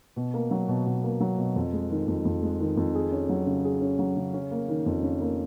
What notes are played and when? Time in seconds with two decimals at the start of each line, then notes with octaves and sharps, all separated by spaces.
0.16 B2
0.34 A#3
0.51 F#3
0.68 B2
0.86 B2
1.03 A#3
1.20 F#3
1.38 B2
1.56 F2
1.73 G#3
1.90 D#3
2.08 F2
2.25 F2
2.42 G#3
2.60 D#3
2.77 F2
2.95 G#4
3.12 C#4
3.29 F#3
3.47 C#3
3.64 G#4
3.81 C#4
3.99 F#3
4.17 C#3
4.33 C#4
4.51 A#3
4.68 D#3
4.86 F2
5.03 C#4
5.20 A#3